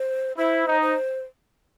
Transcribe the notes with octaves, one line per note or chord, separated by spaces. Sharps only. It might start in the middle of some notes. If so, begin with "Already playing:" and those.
Already playing: C5
E4 C5
D#4
C5